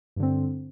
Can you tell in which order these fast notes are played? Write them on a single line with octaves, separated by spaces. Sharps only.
G2 D3 C4